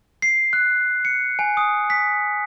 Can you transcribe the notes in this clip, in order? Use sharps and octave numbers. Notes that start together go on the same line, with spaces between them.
C7
F#6
C#7
G#5
D#6
B6